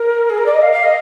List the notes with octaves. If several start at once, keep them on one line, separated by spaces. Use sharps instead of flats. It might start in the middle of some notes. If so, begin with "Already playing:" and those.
Already playing: A#4
G#4
A#4
D5
D#5
F5
F5
D#5